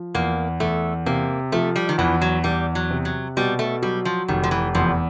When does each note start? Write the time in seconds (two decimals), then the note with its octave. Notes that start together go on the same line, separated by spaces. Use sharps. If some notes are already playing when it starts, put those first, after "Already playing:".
Already playing: F3
0.15 E2 A#3
0.60 E2 A3
1.06 C3 A#3
1.52 F3 A3
1.76 G3
1.89 D#3
1.98 E2 E3
2.21 F#3
2.44 E2 G3
2.75 F#3
2.90 C3
3.05 F#3
3.37 B2 G3
3.59 A3
3.82 F#3 G3
4.05 F3
4.28 F1 D#3
4.43 F3
4.51 E3
4.75 E2 F3